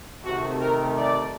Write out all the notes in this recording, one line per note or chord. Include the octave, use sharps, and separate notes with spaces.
C3 D#3 A3 F#4
A#4
D5